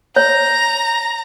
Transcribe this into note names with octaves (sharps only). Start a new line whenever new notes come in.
C#5 A#5